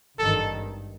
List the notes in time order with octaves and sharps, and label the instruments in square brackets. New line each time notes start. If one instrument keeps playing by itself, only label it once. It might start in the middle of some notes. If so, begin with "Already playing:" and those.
[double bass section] G#1 G2 D#3 [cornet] A4